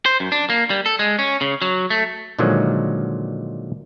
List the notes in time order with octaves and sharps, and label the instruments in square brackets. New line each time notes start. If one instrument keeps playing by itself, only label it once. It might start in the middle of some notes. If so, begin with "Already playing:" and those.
[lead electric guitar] C5
F#2
D4
A#3
G3
A4
G#3
C#4
C#3
F#3
A3
[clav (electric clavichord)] A#2 D3 D#3 F3 F#3 G#3